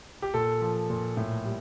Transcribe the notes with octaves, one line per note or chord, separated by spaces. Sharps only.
G4
A#2 A4
F3
A#2
A2
G3